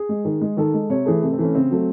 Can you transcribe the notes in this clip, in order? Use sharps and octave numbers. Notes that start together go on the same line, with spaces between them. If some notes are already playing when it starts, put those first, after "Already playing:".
Already playing: G#4
G#3
D#3
G#3
D#3 A4
G#3
C3 C#5
E3 A3 G#4
C3 A3
C4
E3 A3 C#4
C#3 C4
F#3 A3